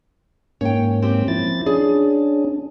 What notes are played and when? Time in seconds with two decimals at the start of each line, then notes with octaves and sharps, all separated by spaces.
0.61 G#2 A#3 C#4 C#5 G5
1.03 C4 G4
1.28 F3 E4 A6
1.66 C#4 D4 G#4